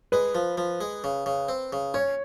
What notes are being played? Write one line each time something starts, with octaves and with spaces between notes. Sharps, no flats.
G#3 B4
F3
F3
G#3
C#3
C#3
C4
C#3
C#4 C#5